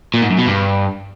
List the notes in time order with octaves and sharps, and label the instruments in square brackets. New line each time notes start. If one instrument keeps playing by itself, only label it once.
[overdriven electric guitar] A#2
G#2
F#2
B2
G2